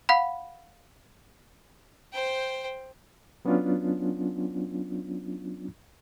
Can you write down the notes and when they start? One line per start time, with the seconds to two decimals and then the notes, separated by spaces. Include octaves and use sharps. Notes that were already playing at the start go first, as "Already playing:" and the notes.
0.09 F5 F#5 B5
2.13 C5 G5
3.45 F#3 B3 C#4 D4 F4